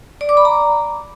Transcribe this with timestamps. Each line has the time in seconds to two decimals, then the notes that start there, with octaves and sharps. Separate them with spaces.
0.21 D5
0.29 D6
0.37 B5
0.45 A#5